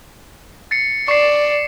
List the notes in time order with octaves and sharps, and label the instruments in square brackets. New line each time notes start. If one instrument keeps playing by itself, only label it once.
[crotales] A6 C7 C#7
[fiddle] D5 [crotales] C#6 C7